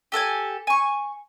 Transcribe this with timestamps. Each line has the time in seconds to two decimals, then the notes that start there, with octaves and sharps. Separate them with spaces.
0.12 G4 A4 F#5 G#5
0.67 G#5 C#6